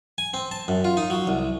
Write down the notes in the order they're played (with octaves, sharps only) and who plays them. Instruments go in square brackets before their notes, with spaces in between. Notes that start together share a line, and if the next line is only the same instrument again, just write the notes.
[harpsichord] G#5
C4
A5
F#2
F4
D#4
F#3
C2